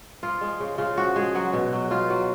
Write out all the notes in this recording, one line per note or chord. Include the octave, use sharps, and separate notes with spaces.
F3 F4
G#3
C#3
C#3 F4
F3 F#4
G#3 G#4
F#3 F#4
B2
F#3
B2 F4
F#3